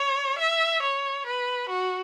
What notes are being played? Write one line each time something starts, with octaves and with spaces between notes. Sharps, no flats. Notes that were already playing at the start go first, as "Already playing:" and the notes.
Already playing: C#5
E5
C#5
B4
F#4